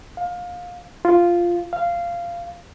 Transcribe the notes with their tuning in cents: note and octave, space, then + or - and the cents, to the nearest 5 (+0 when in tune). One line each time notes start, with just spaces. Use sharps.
F5 +25
F4 -5
F5 -15